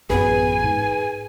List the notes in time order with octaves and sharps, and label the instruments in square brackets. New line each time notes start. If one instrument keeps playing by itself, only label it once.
[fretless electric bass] A1 F#2 B3 [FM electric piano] G#4 B4 [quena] G#5
[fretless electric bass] G#2